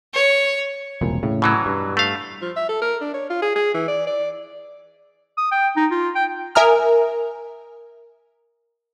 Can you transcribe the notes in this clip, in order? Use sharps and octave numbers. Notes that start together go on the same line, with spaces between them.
C#5
E1 C2 A#2
A2 C#3
B2 E3 F#3
G2
A3 F5
F3
E5
A4
A#4
D4
C#5
F4
G#4
G#4
E3
D5
D5
D#6
G5
D#4
F4
G5
A#4 E5 G#5 A#5 D#6 F6